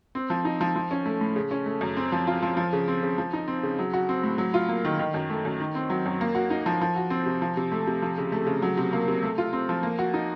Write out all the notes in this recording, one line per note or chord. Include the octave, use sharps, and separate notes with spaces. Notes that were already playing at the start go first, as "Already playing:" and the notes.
C4
F3
D#4
F3
F3
C#4
A3
A2
C#3
C#4
A3
F#2
C4
F3
F4
F3
F3
C#3
C4
C#3
F3
D#4
C4
C#3
F#3
F#4
C4
A2
F#3
F4
A#3
D#3
D#3
F#2
A3
F#2
D#3
C4
F#3
F#2
A#3
F#4
D#4
F3
F3
F#4
C4
C3
F3
C3
A3
C3
F3
C#3
A3
C#3
F#3
C3
A#3
C3
A3
F4
C4
F3
A#3
F#4
D#4